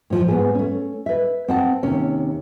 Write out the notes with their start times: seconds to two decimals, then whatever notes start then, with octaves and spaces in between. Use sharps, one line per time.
0.10 A2 F3
0.28 G#2 B3 G#4
0.55 A3 C#4
1.06 B4 E5
1.48 C4 F#5 A5
1.83 D#2 C3 C#4